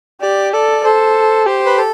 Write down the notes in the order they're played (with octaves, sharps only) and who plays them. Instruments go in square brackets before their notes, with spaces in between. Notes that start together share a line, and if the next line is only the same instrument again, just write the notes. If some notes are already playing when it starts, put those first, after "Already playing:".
[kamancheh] G4 [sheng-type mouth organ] D5
[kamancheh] A4 [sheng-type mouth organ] D5
[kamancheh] A4 [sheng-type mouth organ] C5
[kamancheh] G4 [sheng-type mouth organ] C5
[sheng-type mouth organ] B4
A4